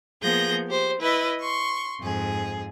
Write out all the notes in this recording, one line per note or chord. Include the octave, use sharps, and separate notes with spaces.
F3 A#3 B3 G#4 G6 A#6
G4 C5
E4 B4 D#5
C6 C#6
F2 G#2 G#4